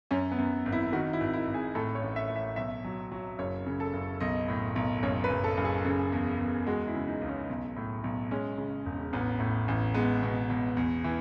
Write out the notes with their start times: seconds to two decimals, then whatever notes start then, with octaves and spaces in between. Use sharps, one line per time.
0.11 F#2 C#4
0.32 B3
0.38 F#2
0.66 G#1
0.72 E4
0.92 D#3 F#4
1.13 E4
1.20 G#1
1.33 E4
1.47 G#1
1.54 G#4
1.75 A2 A4
1.95 C#5
2.02 A1
2.16 E5
2.29 A2
2.36 E5
2.56 B1 E5
2.84 F#3
3.12 F#3
3.38 F#1 C#5
3.66 C#3
3.80 A4
3.93 F#1
4.20 B1 D#5
4.48 A2
4.76 B1
5.03 F#1 C#5
5.24 B4
5.30 F#1
5.44 A4
5.57 F#1
5.64 G#4
5.85 C#3
6.12 E2
6.40 E2
6.66 G#3 F#4
6.87 E4
6.94 C#3
7.08 D#4
7.21 C#2
7.28 C#4
7.49 B1
7.76 A2
8.04 B1
8.31 G#3 C#4
8.58 C#3
8.85 E1
9.13 A1 B3
9.40 A2
9.68 A1
9.94 G#3 B3
10.23 B2
10.50 B2
10.77 E2
11.04 E3